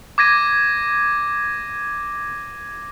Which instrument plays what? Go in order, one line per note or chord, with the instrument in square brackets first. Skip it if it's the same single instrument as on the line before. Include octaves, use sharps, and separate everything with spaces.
[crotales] D6 G#6 A#6 D#7